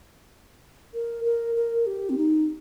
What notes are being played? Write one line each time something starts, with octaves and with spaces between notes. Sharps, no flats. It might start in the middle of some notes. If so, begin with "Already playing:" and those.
A#4
A#4
A#4
G4
C4
D#4